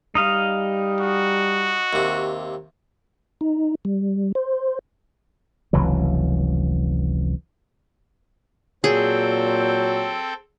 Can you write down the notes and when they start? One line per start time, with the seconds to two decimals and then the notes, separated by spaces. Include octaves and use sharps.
0.15 G3 D#4 D#5 F5
1.01 F#4
1.93 D#2 C3
3.41 D#4
3.85 G3
4.35 C5
5.73 F1 C#2 E3 F#3
8.84 A#2 F#3 C4 G#4 A4 G5